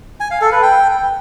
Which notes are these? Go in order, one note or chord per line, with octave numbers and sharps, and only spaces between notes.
G#5
F5
A4
B4
G5